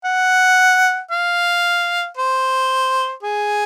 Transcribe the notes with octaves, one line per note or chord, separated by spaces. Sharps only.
F#5
F5
C5
G#4